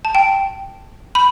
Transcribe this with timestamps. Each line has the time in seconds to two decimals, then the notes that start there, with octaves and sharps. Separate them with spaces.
0.05 A5
0.15 G5
1.15 B5